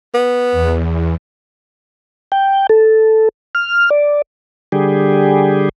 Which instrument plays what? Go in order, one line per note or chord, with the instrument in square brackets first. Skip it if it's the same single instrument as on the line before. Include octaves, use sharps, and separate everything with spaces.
[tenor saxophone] B3
[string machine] E2
[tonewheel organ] G5
A4
F6
D5
D3 G3 G4 G#4